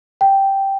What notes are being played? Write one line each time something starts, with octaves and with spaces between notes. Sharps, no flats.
G5